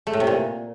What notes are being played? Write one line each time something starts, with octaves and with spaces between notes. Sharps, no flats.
A3
A2
C3
A#2